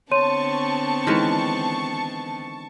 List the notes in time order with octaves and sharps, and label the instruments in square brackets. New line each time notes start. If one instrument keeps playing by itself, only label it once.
[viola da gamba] D3 B3 C4 [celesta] C#5 C6 D#7 [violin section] A5 C#6
[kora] D#3 E3 G#3